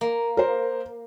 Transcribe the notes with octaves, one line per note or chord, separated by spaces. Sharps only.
A#3
A#4 C5